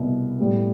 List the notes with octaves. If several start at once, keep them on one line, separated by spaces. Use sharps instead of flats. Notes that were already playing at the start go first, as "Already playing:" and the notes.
Already playing: C2 B2 B3
A2 G3 B3